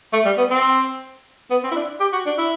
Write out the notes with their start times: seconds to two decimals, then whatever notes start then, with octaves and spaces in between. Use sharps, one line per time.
0.13 A3
0.25 G3
0.37 B3
0.50 C4
1.50 B3
1.63 C4
1.71 E4
1.75 D4
2.00 G4
2.13 F#4
2.26 D4
2.38 E4